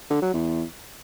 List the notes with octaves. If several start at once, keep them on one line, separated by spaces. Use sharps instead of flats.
D3
F#3
E2